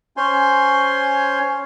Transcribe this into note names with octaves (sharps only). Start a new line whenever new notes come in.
C#4 C5 C#5 G#5 C6